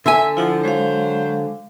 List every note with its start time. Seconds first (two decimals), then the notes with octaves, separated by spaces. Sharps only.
0.06 D3 E5 G#5
0.37 F3 E4 F#5
0.63 F#3 G#3 C5 F5